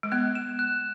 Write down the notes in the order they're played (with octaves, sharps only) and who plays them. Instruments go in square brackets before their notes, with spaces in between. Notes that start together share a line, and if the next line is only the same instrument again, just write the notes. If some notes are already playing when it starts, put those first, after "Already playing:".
[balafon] G#3
[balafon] B3 [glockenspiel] F#6
[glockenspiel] E7
F#6